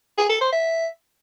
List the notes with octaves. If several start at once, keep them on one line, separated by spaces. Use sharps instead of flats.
G#4
A4
C5
E5